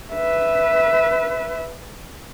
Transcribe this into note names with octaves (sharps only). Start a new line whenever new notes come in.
B4 E5